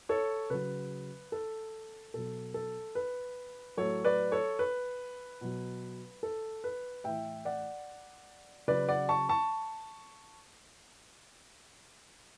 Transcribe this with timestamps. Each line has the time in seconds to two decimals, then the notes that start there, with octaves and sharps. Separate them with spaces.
0.09 A4 C#5
0.50 C#3 F#3 B4
1.32 A4
2.14 B2 F#3 A4
2.54 A4
2.95 B4
3.77 A2 F#3 A4 C#5
4.05 B4 D5
4.32 A4 C#5
4.59 B4
5.41 B2 F#3
6.23 A4
6.64 B4
7.04 A2 E3 E5 G5
7.45 D5 F#5
8.68 C#3 F#3 B4 D5
8.89 D5 F#5
9.09 A5 C#6
9.29 A5 C#6